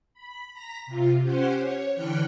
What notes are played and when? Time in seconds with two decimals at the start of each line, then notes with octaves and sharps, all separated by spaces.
0.14 B5
0.53 A#5 A#6 B6
0.86 C3 F4
1.21 C#4 G4 C5 F#5
1.59 C#5
1.93 D3 E3 G5 F6 F#6 C#7